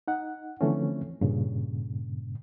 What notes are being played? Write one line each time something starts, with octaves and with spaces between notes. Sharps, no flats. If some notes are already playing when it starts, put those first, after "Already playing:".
D#4 F#5
D3 E3 F3 A3 C4 C#4
G2 A#2 C#3